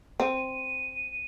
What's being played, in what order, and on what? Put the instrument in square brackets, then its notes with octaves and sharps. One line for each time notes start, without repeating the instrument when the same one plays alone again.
[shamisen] C4 [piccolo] D#7